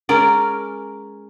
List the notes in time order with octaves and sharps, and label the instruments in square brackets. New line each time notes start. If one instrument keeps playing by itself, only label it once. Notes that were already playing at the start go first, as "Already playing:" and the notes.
[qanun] G#3 C#4 A#4 D5